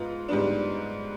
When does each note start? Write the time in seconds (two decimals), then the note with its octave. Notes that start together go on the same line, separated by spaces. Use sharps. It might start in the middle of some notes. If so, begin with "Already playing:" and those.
Already playing: G#2 B3 F4
0.29 G#2 G3 B3 D4